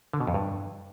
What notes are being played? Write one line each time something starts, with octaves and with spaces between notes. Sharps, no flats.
D3
B2
F2
G2